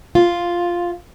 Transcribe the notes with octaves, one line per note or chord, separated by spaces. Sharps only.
F4